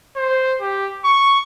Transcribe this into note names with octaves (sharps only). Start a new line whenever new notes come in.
C5
G4
C#6